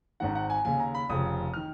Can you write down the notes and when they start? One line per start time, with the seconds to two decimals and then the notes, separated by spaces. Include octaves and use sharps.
0.20 G#1 G#2 D#3 F#5
0.35 F#5
0.50 G#5
0.65 D#2 C#3 G#5
0.80 A#5
0.95 B5
1.09 F1 F2 C#3 D#6
1.54 D#3 F6